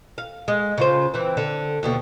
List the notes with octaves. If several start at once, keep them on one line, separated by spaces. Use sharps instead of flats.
F5
G#3
C#3 F4 C5
E3 C4
D3
D#2 B2 D3